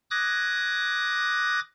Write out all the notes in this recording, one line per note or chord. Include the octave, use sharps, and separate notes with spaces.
D6 D#6 F#6 G#6 A#6